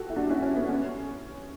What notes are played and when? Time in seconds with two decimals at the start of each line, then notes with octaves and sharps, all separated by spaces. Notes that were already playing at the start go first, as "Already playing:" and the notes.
Already playing: F#4 G4 A4
0.10 E4
0.16 D4 F#4
0.30 C#4 E4
0.42 C#4
0.56 B3
0.69 C#4